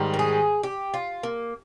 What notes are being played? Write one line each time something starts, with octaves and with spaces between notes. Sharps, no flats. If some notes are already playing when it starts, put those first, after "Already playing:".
Already playing: G#2 D#3 G3
A#4
G#4
G4
F4
A#3